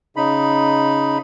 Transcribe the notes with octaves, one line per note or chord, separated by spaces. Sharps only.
C#3 D#4 B5